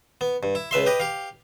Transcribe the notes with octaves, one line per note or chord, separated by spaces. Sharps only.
B3
G2
E4
C#2 B4 E5 C6
G4 B4 D#5
G4 F5